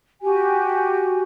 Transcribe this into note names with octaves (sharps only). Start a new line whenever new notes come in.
F#4 G4 G#5